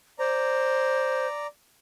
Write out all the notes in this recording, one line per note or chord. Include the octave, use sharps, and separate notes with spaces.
C5 D5 A#5